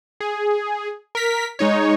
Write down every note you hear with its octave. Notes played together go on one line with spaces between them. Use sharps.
G#4
A#4 B6
G#3 D#4 C#5